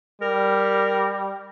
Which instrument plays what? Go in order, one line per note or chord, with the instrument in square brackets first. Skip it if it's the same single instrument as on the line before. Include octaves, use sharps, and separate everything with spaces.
[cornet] G3 [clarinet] A#4